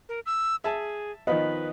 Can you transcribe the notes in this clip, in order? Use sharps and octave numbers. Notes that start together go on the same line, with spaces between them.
A#4
E6
G#4 E5 A5
D#3 F3 B3 B4 D#5